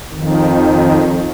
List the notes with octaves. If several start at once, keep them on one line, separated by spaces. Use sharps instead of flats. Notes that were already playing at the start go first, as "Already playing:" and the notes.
F2 D#3